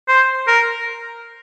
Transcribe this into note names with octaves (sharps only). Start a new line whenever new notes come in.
C5
A#4